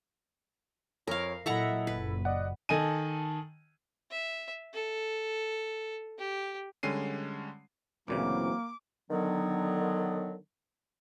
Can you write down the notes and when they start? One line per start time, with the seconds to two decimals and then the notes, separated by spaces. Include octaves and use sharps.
1.07 F2 A#4 C#5 F5
1.46 A#2 F#3 E4 A4 D#5 E5 F#5 A#5
1.87 F#1 A#2 B4
2.25 D5 D#5 F#5
2.69 D#3 A4 D#5 G#5 A5 D#7
4.11 E5
4.73 A4
6.18 G4
6.83 D3 G3 G#3 C#4 C7 D#7
8.08 D2 A#2 C#3 E3 F#3 A#3 C4 D6
9.11 D3 D#3 F#3 B3